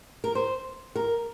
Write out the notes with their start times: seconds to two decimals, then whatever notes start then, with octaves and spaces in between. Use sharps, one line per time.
0.24 A#4
0.35 C5
0.96 A#4